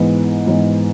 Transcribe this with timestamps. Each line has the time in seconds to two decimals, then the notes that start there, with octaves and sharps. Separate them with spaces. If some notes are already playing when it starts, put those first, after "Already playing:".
Already playing: G#2 E3 B3
0.46 G#2 E3 B3